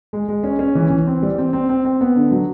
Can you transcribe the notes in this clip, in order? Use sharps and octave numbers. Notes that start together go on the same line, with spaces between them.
G#3
G#3
C#4
C#4
E3
E3
C4
G3
C4
C4
C4
C4
B3
D3
F#3